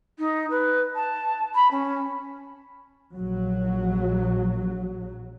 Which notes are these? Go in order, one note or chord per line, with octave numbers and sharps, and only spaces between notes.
D#4
B4
A5
B5
C#4
A#1 F#3